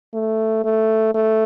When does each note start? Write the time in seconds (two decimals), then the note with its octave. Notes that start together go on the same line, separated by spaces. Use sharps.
0.14 A3
0.64 A3
1.14 A3